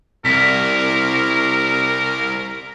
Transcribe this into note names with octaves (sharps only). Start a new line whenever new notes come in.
C2 A#4 B6